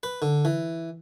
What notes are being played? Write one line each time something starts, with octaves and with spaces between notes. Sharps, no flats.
B4
D3
E3